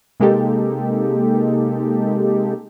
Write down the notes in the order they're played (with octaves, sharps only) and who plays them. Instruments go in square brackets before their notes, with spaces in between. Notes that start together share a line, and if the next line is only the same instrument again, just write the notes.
[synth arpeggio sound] C3 G#3 A#3 D#4 G4 A4